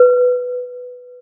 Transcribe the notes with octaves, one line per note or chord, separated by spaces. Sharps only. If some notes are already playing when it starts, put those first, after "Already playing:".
Already playing: B4